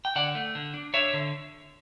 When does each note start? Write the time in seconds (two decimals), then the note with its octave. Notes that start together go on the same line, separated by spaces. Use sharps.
0.05 G5
0.16 D3 D5 F#5
0.35 A3
0.55 D3
0.74 D4
0.94 D4 C#5 E5
1.14 D3